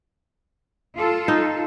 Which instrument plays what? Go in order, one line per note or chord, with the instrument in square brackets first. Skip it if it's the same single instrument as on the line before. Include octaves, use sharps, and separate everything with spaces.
[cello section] F4 A4
[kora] D#4